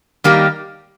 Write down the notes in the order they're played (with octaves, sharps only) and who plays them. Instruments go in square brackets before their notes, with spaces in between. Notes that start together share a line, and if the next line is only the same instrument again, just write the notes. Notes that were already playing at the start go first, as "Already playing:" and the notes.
[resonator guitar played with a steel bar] D#3 G3 A#3 D#4 G4